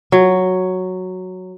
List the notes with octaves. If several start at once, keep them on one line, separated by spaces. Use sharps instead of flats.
F#3